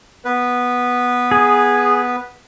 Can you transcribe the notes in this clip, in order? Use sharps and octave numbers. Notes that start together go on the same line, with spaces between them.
B3 B4
G#4